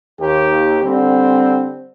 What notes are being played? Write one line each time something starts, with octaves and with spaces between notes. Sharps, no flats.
D#2 G4
D3 G3 C4